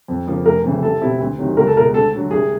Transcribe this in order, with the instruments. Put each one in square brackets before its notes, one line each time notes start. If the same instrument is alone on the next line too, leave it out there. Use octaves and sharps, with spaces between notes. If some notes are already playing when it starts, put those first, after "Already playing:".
[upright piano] F2
C#3 F3 A#3
[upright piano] F1 [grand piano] A#4
[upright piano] F2 C#3 E3
[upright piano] C2 [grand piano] A4
[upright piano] B2 G3 C4 E4
D2
C3 D#3 F#3
[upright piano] C#2 [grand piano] A#4
[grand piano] A4
[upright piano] B2 [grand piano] A#4
[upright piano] G#3
[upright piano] D2 [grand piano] A4
[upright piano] D3 F#3
[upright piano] C2 [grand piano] G#4